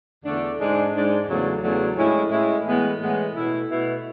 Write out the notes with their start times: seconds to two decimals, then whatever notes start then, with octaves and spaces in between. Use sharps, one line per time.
0.25 E2 D3 A3 D4
0.59 G#2 G#3 D4
0.93 G#2 G#3 D4
1.28 E2 C#3 F#3 A3 D4
1.62 E2 C#3 F#3 A3 D4
1.97 A2 G#3 C#4 E4
2.31 A2 G#3 C#4 E4
2.65 A2 E3 G#3 B3
3.00 A2 E3 G#3 B3
3.34 B2 A3 E4
3.68 B2 A3 E4